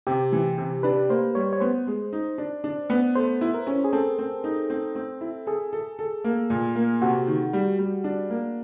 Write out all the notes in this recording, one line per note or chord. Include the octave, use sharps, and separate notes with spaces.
C3 G4
E3
C3
D4 B4
A#3 C5
G3 C#5
C#5
B3 C5
G#3
D#4
D4
D4
B3
A3 C5
E4
A#4
C#4
G#4
C4 A4
C4
D#4
C4
C4
E4
G#4 A4
A4
A4
A#3
A#2
A#3
C3 F#4
D#3
G3
G3
D4
A#3